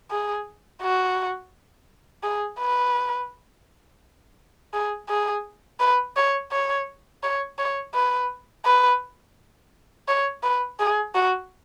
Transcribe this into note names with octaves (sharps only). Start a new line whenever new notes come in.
G#4
F#4
G#4
B4
G#4
G#4
B4
C#5
C#5
C#5
C#5
B4
B4
C#5
B4
G#4
F#4